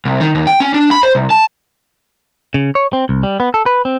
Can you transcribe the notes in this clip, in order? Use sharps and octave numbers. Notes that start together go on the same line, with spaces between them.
C2
D#3
D#2
G5
C#4
D4
B5
C5
C2
A5
C#3
C#5
C4
C2
G3
B3
A4
B4
C4